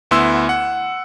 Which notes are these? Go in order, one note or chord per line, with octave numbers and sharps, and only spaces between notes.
D2 B3 E4 C6 E6
F#5